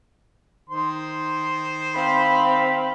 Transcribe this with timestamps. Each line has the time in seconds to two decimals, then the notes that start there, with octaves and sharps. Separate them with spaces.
0.70 D#3 C5 C6
1.95 C4 F5 B5